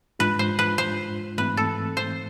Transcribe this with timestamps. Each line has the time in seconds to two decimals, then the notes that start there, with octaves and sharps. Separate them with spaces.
0.19 G#2 G#3 D4 F4 B4
0.39 C5
0.59 B4
0.78 C5
1.38 G#2 E3 A3 C4 B4
1.57 A4
1.97 C5